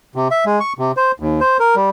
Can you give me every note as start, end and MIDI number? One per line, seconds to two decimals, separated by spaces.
0.16 0.28 48
0.31 0.44 76
0.46 0.59 56
0.60 0.73 85
0.79 0.92 48
0.97 1.12 72
1.20 1.40 39
1.40 1.57 72
1.60 1.75 70
1.76 1.90 55